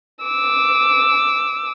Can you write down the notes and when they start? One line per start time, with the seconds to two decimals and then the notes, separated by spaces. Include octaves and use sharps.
0.24 D6 E6